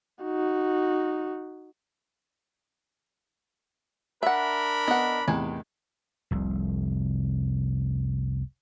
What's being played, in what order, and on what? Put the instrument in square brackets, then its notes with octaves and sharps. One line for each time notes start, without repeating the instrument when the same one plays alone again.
[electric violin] D#4 F#4
[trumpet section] D4 A#4 B5 [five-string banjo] E5 F#5
[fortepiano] B3 [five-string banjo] D#5 F#5
[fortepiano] E2 A2 C3 [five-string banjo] D#3 B4 G#5
[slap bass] F1 C2